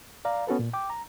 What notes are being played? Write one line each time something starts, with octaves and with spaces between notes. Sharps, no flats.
D5 F5 A#5
B3 C#4 F#4 A4 B4
A#2
G5 D6
A#5